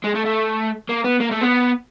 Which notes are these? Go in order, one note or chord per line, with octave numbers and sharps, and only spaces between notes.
G#3
A3
A3
A#3
B3
A#3
A3
B3